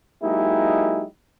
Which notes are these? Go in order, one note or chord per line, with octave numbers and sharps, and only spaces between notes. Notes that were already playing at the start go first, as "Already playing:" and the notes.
F#3 G#3 A#3 D#4 E4 G4